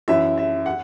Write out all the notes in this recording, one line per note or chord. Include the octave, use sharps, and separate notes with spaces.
F#2 E3 E5
E5
F#5